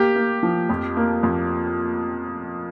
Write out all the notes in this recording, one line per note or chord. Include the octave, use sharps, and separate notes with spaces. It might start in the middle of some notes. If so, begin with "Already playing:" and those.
Already playing: A#3 G4
A#3
F3
F2
A#3
F2